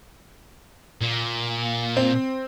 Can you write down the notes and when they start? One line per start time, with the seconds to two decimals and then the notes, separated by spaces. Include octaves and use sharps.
1.01 A#2
1.97 C4